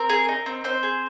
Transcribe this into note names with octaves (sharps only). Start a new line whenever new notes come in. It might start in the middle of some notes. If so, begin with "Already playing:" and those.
Already playing: C4 A#4
G#4
D#4
C4
C4 C5
G#4